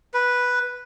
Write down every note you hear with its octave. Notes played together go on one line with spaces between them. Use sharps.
B4